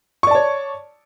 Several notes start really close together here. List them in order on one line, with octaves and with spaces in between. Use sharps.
C#6 D5 A5 C#5